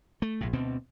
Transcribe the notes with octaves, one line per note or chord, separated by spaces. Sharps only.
A3
A#1 A2
D2 B2 C4